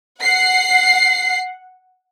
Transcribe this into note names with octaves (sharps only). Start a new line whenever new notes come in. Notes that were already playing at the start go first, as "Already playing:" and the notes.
F#5 C7